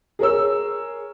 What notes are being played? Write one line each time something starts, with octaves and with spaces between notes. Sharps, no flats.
G#4 A#4 C#5 E6